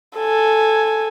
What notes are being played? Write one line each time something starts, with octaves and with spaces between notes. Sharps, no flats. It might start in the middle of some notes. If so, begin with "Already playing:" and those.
A4 G#5